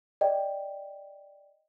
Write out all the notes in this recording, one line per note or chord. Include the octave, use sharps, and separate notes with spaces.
D5 D#5 G5